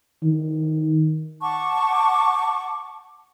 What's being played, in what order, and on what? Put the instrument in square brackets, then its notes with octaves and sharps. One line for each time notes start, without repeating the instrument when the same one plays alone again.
[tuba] D#3
[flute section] F#5 A5 C#6 D6